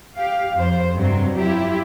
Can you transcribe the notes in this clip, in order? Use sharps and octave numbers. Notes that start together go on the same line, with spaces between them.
G4 F5
F2 C5
G2 C3 F#3
E4 F4 G4